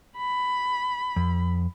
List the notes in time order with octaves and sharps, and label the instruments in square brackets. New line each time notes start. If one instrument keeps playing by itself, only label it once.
[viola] B5
[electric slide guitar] F2